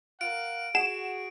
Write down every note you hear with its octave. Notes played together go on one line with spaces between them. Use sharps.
A#4 F5 F#5 D7
F#4 G#4 F#5 E7